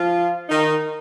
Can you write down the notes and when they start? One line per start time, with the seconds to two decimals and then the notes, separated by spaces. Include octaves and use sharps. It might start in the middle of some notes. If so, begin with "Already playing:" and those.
Already playing: F3 F4
0.49 D#3 D#4